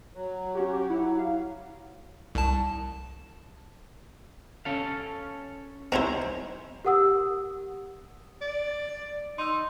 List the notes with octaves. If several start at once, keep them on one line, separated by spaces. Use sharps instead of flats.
F#3
C#4 F#4 G4
G4
E4 F#5
F5
C2 A5
C#4 A4 F5
C4 C#4 D#4 E4 C5
G4 A#4 F#5 D#6 E6
D5
D#4 C6 E6